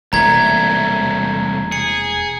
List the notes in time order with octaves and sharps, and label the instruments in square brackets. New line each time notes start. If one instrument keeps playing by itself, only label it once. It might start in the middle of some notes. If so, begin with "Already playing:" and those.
[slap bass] E1 E3 A#3 [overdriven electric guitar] C2 A3 [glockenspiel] A#5 G#6
[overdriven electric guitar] G#4 [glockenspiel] C#7